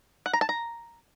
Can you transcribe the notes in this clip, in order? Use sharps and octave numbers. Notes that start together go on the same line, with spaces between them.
F#5
A#5
A5
A#5